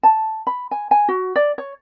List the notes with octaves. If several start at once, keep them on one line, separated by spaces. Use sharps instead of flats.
A5
B5
G#5
G#5
F#4
D5
C#5